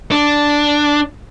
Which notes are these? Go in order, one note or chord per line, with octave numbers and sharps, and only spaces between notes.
D4